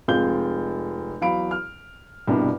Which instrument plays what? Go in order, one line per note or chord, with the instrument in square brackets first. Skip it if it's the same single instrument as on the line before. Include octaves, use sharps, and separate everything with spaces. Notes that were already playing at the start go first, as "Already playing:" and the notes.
[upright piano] F1 G#3 C4 F4 G6 G7
E2 F#3 F5 B5 D7
F6
C2 G2 B2